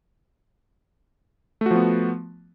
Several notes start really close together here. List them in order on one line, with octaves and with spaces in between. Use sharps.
A3 F#4 F3 B3